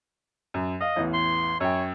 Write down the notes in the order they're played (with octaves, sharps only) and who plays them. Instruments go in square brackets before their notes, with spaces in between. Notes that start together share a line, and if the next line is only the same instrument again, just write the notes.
[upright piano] F#2
[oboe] D#5 [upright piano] F5
[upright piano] A1 E2
[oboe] C6
[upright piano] F#2 G5 [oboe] C#5